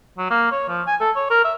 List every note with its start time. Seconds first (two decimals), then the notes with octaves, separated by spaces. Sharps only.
0.18 F#3
0.30 A#3
0.52 C#5
0.69 F3
0.87 G#5
1.00 A4
1.16 C#5
1.30 A#4
1.44 E5